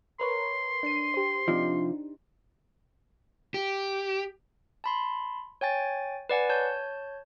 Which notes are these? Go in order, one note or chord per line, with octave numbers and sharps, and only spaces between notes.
A#4 B4 C#5 C6
D4 C7 D#7
G4 C5
C3 F3 D4 D#4
G4
A5 B5 C6
C#5 G5 G#5 A6
B4 D5 F#5 G#5
C#5 A5 G6